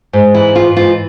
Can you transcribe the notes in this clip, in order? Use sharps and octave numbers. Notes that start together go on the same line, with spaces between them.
G#2
E3 E4
E3 F4
G#2 F4